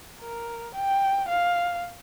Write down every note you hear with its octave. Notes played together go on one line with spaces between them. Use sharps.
A#4
G5
F5